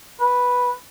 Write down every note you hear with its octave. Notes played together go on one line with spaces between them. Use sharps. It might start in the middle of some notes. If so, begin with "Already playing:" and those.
B4